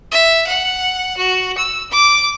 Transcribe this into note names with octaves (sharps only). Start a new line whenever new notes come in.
E5
F#5
F#4
E6
D6